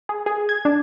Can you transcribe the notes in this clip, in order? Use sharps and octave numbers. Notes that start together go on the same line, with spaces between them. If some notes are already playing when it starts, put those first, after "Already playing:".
G#4
G#4
G#6
D4